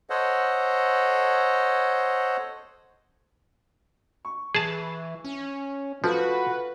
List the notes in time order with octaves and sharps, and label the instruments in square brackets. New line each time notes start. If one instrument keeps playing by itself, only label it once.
[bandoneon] A4 C5 C#5 D#5 F#5
[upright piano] C#6
[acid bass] E3 [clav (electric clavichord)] G#4 A5
[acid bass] C#4
[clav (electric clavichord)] F3 [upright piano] F4 A4 [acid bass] F#4 [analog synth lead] B4